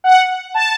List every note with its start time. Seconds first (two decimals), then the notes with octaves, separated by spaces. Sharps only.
0.04 F#5
0.54 A5